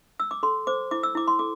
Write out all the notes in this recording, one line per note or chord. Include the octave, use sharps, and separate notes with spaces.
E6
D6
A4 C6
C5 D6
E4 D6
E6
E4 D6
C6
A4 D6